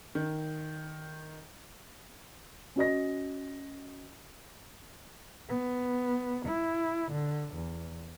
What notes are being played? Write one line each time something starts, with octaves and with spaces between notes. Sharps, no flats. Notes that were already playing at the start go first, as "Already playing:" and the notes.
D#3
C#4 F#4 D#5 A#6
B3
E4
D3
E2